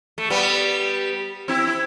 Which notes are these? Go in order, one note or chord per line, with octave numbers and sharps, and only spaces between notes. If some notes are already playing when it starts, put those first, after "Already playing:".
A3
G3 B3
C4 E4
E4